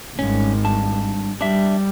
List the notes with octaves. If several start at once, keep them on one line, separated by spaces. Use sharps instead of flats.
G#1 G2 C#4
G2 A5
G3 D4 E5